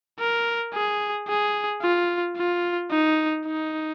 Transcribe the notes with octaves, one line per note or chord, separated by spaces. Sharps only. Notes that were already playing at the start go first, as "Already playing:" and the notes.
A#4
G#4
G#4
F4
F4
D#4
D#4